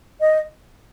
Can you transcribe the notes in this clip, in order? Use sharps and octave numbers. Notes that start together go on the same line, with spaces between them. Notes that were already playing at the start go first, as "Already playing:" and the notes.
D#5